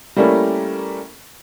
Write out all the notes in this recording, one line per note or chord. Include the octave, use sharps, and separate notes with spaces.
G3 A3 A#3 C#4 E4